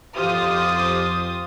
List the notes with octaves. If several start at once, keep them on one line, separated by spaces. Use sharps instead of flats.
F2 F4 G4 C5 D#6